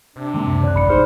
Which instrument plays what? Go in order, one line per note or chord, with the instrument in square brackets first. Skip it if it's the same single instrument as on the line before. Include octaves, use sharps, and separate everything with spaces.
[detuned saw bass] C3 [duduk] D4
[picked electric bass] D#3 G#3 A#3
C#2 F#2
[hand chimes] D5 F#6
[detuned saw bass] A1 [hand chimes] B5 C#7
[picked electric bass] A#1 [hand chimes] D#4 G#4 F6 [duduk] C5